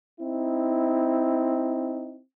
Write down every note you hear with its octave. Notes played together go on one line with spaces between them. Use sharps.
C4 D#4 E4